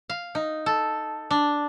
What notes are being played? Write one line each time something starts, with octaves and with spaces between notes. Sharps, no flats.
F5
D#4
A4
D4